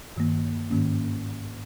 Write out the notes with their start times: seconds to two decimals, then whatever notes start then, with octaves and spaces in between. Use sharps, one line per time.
0.16 G2 D#3 A#3
0.70 G#2 D#3 A#3 C#4